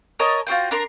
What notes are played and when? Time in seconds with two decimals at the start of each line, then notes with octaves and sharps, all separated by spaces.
0.19 A#4 C#5 D#5 A5
0.47 F4 F#4 C5 G5
0.71 D4 A#4 A#5 C6